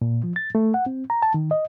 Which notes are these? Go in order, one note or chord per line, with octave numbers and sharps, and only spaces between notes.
A#2
F3
A6
A3
F#5
C4
A#5
A5
D#3
D#5